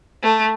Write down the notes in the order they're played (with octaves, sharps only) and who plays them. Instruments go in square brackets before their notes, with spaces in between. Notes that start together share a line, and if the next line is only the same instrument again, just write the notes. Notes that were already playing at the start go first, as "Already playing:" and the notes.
[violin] A3